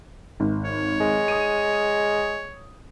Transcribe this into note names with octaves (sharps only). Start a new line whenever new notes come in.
G#1
C#5
G#3
D#6 D#7